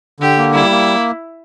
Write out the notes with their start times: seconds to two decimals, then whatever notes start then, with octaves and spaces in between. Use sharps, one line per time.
0.20 D3 G4
0.37 A#3
0.53 G3 E4
0.70 A#3